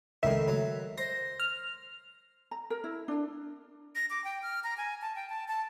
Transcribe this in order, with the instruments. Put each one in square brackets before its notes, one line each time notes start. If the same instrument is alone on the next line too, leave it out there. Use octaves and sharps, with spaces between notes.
[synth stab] C#2 E5 [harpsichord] A2 D#3
[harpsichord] F#3
[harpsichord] C5 [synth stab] A#6
[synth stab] F6
[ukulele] A#5
A#4
E4
D4
[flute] A#6
D6
G5
F6
A#5
G#5
A5
G5
A5
A5